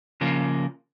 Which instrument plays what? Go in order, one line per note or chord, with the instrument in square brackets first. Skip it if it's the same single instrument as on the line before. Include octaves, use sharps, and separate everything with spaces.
[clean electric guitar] C#3 F3 A#3